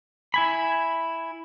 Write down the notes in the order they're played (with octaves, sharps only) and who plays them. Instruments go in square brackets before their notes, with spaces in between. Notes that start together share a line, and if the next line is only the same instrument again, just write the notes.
[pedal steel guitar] E4 G#5 B5